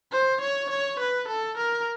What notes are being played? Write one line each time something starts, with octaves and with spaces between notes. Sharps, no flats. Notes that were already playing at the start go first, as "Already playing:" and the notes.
C5
C#5
C#5
B4
A4
A#4